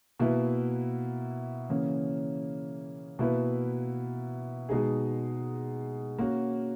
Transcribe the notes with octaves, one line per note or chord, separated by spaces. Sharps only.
B2 A#3 E4 B4
C#3 E3 A#3 C#4
B2 A#3 E4 B4
B2 G#3 D#4 G#4
A#3 C#4 F#4